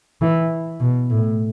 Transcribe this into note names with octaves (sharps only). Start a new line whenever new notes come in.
E3
B2
A2